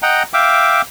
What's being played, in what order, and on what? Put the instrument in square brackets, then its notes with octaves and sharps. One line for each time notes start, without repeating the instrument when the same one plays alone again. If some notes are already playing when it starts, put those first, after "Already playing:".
[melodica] D#5 F#5 G5 A#5
E5 F5 G5 D6